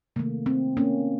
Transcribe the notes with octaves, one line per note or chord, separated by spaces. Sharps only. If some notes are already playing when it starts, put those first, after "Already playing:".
C3 D#3 A3 A#3
C4
A#3 C#4